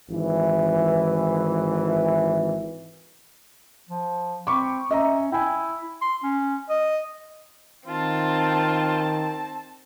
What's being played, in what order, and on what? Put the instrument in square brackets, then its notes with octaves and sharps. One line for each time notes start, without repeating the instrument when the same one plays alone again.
[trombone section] G#1 E3
[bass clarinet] F3
[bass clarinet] C4 [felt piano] B5 C#6 D6
[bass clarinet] C#4 [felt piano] D#5 E5 A#5
[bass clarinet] E4 [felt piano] G5 G#5
[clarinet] C6
C#4
D#5
[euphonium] D#3 [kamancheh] C4 A5 [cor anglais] F4